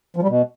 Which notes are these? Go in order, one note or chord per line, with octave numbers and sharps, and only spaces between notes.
F3
G3
B2